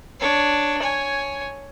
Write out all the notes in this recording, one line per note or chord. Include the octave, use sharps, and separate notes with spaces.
D4 C#5
C#5 G#5